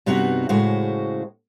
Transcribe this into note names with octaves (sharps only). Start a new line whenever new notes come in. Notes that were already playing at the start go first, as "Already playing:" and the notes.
G2 C3 B3 D#4 F#4 A#5
A2 C#3 G#3 F#4 C5